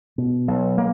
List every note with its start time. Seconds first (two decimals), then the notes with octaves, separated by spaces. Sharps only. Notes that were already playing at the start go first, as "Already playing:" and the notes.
0.18 B2
0.48 B1
0.78 A#3